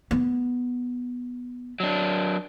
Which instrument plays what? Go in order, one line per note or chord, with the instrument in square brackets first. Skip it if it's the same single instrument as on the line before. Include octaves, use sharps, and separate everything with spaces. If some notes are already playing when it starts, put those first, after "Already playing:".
[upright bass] B3
[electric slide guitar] F#3 D4